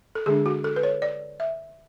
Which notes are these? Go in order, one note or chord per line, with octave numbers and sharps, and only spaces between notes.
A4
D3 G#3 D4 G#4
F#4
A4
B4
C#5
D5
E5